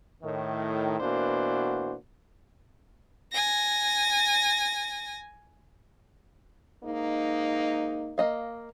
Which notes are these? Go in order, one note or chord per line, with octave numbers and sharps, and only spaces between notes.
A2 D#3
B2 E3 A#3 D4 F#4 C5
G#5 A#6
G#2 A#3 D#4
A#3 D#5 F5